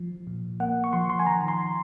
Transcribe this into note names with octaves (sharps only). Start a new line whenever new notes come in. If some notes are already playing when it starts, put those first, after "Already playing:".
Already playing: F3
A#2
A#3 F#5
C#6
F3 C6
C6
G#5
D#3 A#5
A#5
C6